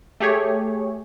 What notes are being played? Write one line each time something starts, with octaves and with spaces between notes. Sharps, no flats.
A3 G4 G#4 C#5